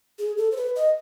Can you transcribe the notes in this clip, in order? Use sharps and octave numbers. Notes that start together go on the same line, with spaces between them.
G#4
A4
C5
B4
D#5